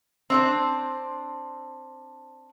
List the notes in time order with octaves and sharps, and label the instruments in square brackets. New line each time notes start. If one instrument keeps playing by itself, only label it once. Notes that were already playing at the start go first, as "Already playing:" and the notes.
[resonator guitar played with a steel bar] C4 D4 C5